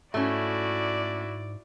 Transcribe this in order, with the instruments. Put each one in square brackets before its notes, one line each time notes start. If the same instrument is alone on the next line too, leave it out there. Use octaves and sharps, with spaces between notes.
[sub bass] G#2 [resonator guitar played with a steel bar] A3 C#4 [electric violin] E4 F#4 [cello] D5